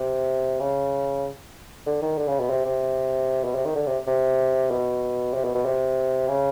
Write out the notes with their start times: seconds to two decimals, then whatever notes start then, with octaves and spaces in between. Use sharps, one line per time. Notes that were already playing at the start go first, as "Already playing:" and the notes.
Already playing: C3
0.60 C#3
1.87 D3
2.02 D#3
2.18 D3
2.28 C#3
2.40 B2
2.50 C3
2.65 C3
3.44 B2
3.55 C3
3.65 D#3
3.75 D3
3.87 C3
4.07 C3
4.71 B2
5.34 C3
5.44 B2
5.54 B2
5.65 C3
6.28 C#3